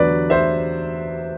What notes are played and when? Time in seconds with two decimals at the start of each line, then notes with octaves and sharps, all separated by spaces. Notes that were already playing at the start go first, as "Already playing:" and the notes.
Already playing: E2 D3 F#3 B3 B4 D5
0.30 C5 E5